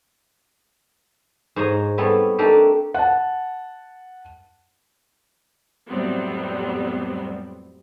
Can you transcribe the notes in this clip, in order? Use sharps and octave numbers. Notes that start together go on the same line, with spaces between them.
G#2 C5 C#5 D#5 A#5
G3 B3 C4 A4 C#5
A3 A#3 D4 D#4 G4 A4
F#5 A5
F2 A2 F#3 G3 B3 C4